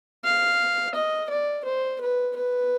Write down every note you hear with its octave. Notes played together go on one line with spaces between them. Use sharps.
F5
D#5
D5
C5
B4
B4